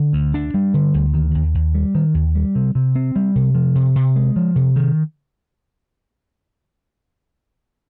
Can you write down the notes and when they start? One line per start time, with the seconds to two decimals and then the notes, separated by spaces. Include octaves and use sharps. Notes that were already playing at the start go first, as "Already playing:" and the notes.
Already playing: D3
0.13 D2
0.34 D4
0.54 G3
0.74 D3
0.94 D2
1.14 D#3
1.35 D#2
1.55 D#2
1.75 G3
1.95 D#3
2.14 D#2
2.35 G3
2.55 C3
2.75 C3
2.95 C4
3.16 G3
3.36 C3
3.55 F3
3.75 C3
3.96 C3
4.16 G#3
4.36 F3
4.56 C3
4.76 D#3